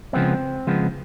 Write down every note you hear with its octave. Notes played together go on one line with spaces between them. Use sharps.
C#3 F3 G#3 B3 C4
C#3 F3 G#3 B3